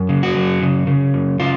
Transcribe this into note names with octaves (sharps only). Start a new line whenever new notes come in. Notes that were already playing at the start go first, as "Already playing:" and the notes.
Already playing: F#2
C#3
F#4
F#2
C#3
C#3
F#2
C#3 F4